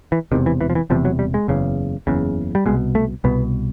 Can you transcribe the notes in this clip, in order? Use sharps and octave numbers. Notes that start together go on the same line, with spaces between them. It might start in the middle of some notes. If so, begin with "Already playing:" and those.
E3
E1 E2 C3 D#3
E3
E3
F3
E3
E1 E2 C3 F3
F#3
G3
G#3
F#1 E2 C#3
F#1 E2 C#3
G3
C2 B2 G#3
A3
C2 B2 B3